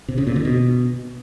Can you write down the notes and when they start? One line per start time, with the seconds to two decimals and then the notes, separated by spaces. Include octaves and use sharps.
0.08 C3
0.18 C#3
0.27 A#2
0.36 D3
0.45 B2